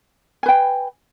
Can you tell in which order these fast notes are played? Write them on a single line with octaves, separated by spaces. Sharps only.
G#5 B4 G5